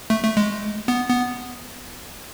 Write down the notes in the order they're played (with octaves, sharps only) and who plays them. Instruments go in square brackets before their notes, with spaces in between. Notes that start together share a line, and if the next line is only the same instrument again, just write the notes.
[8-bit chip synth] A3
A3
G#3
B3
B3